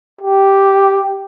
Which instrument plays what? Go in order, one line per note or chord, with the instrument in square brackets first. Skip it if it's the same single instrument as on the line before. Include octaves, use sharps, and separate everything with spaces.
[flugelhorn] G4